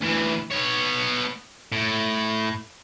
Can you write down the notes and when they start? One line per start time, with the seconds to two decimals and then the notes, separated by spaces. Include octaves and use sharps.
0.01 D2 E3
0.52 B3 C#5
1.72 A2